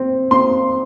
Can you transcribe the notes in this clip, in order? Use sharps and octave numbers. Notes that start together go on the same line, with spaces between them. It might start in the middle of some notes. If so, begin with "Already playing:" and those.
Already playing: C4
C4 C6